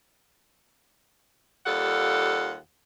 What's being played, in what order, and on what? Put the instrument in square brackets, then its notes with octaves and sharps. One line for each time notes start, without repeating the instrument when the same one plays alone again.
[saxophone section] D#2 G3 F4 A4 F#5